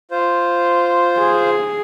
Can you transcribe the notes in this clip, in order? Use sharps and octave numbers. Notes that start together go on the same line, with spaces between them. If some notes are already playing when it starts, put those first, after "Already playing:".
F4 C5
G#4